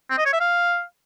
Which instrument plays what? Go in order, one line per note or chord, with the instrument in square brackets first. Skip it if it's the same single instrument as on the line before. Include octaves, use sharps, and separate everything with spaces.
[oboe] C4
D#5
C#5
E5
F5